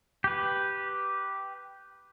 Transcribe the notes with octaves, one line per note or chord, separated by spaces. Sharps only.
G4 B4